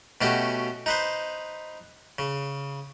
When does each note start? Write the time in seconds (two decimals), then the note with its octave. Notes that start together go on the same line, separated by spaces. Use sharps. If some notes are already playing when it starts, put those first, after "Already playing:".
0.21 B2 A3 C#4 F#4 G4
0.86 D#4 B4 C5
2.19 C#3